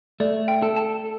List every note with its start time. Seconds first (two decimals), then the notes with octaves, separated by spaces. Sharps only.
0.20 A3 D5
0.48 G5
0.62 A4
0.76 A5